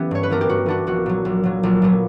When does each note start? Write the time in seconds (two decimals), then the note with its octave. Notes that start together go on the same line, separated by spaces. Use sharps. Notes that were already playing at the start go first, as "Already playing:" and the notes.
Already playing: E3 B3 C#4 G4
0.11 G2 C#5
0.23 B4
0.30 E3 B3 D4 A#4
0.41 G4
0.49 G2 F#4
0.66 E3 B3 D4 F#4
0.87 A#1 F#4
1.06 A#2 F#3
1.25 A#1
1.44 A#2 F#3
1.63 A#1
1.82 A#2 F#3 B3